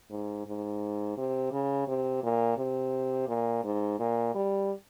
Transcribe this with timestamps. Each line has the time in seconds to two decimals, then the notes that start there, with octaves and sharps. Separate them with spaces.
0.11 G#2
0.46 G#2
1.17 C3
1.52 C#3
1.88 C3
2.23 A#2
2.58 C3
3.28 A#2
3.64 G#2
3.99 A#2
4.35 G3